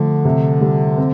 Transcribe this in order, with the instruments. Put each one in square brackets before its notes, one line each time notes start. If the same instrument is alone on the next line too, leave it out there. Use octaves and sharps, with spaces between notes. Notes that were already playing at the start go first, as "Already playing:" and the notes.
Already playing: [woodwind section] D3 [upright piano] F3 A3
[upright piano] C3
G3
C4